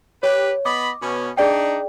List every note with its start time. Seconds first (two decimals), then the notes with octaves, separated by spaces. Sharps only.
0.23 G4 B4 C#5
0.65 B3 D#5 B5 D6
1.01 B2 B3 C#4
1.37 D4 D#4 G#4 D5 G5